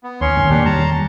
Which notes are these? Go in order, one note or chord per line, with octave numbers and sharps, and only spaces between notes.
B3
D#2 C#4 C#5 C6
A#1 F2 D#3
E2 A#3 D4 G4
E2 D#3 G3 A5 A#5